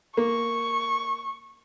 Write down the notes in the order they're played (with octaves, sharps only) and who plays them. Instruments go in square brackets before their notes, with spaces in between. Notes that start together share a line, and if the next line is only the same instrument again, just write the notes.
[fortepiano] A#3 [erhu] C#6